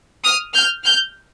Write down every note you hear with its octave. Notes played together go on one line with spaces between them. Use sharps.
D#6 F6
F6 G6
F6 G6